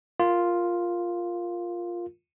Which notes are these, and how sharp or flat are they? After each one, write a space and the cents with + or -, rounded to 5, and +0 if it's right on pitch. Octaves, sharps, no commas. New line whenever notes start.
F4 +0 A#4 +0